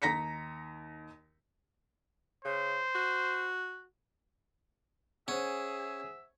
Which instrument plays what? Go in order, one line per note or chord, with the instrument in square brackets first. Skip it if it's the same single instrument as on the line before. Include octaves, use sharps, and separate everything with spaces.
[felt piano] D#2 A#5 A#6 B6 C#7
[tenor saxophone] C#3 [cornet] C5
[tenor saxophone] F#4
[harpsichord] C#4 [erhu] G#4 [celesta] C5 F#5 [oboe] E5